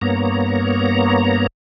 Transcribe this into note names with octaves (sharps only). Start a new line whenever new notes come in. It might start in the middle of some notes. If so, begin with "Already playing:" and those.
G2 A#3 B3 C#5 A#5